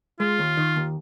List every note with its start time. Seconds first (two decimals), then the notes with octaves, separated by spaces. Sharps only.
0.20 G#3 F4
0.39 D#2
0.57 D#3
0.76 D#2